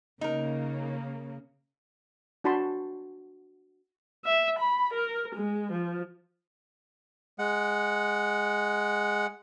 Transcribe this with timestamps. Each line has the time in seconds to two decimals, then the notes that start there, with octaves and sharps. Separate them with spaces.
0.21 C#3 A#3 D#4 A#4
2.44 D4 F#4 A5 B5 C6
4.23 E5
4.57 B5
4.92 A#4
5.34 G#3
5.71 F3
7.39 G#3 F#5